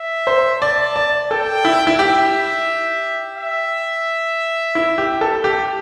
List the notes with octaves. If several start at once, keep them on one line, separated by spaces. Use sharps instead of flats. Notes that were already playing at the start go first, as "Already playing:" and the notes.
Already playing: E5
C5
D5 A5
D5
A4 G5
E4
E4
G4 E5
E5
E4
G4
A4
G4